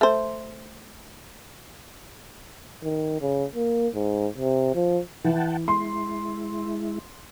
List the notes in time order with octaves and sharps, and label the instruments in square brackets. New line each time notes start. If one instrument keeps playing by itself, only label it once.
[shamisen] A3 C5
[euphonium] D#3
C#3
A#3
G#2
C3
F3
[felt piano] E3 [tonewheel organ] F#5 G5 A5
[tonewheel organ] G#3 E4 [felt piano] C6